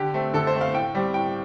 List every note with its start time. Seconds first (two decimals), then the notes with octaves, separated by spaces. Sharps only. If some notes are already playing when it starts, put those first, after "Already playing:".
Already playing: D3 G4
0.14 A3 C4
0.34 D3 A4
0.47 C5
0.54 A3 C4
0.61 F5
0.73 A2 G5
0.95 G3 C4
1.14 A2 G5